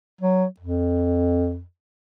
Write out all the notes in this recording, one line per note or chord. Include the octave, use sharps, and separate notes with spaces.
F#3
F2